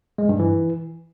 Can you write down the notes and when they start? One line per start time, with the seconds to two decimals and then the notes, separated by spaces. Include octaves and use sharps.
0.18 G#3
0.29 G2
0.39 E3